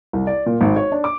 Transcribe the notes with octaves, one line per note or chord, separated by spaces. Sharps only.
C2
D5
A#2
G#1
C#5
D4
D6